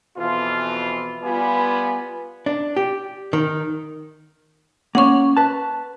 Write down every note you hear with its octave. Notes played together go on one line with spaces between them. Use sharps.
F2 B2 E3 F4
G3 B3 F4 D5 G#5 B5
D4
G4
D#3
A#3 C#4 C#5 F#5 C#6
B4 A5